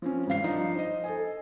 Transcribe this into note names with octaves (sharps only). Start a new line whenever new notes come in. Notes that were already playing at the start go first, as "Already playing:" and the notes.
F3 C4 C#4
G#1 G3 F5 C7
F3 D4 D#4
C5 D#5
A4 D#5 G#5